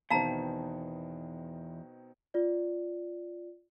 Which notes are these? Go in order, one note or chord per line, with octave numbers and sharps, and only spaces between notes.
E2 B2 D#3 C4 F5 A5 A#5
F4 D5